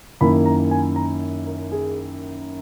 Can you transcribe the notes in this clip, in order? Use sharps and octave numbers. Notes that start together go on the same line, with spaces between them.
F#2 D#3 A#3 E4 B5
A#5
G#5
A#5
A#4
G#4